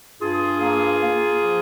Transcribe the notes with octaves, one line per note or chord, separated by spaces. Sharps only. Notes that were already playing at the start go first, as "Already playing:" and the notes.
G2 F4 G#4
A#3
A#3
F3